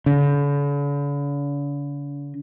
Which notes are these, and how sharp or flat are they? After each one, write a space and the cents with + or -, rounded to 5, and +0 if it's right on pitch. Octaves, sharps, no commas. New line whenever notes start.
D3 -45